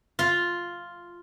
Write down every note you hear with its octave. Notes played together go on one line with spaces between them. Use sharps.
F4